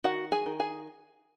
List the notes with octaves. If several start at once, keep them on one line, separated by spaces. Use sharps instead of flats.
D#3 F#4 F#5
G#4 G#5
D#3
G#4 G#5